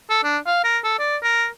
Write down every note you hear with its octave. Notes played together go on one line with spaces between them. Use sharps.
A4
D4
F5
A#4
A4
D5
A#4